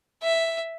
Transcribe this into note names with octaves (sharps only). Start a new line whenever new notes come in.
E5